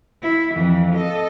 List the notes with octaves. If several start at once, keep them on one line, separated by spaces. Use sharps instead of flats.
E4
F2 E3
A4 D#5